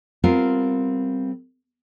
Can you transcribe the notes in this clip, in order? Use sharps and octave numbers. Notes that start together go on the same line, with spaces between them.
G3 B3 C4 F4 A#4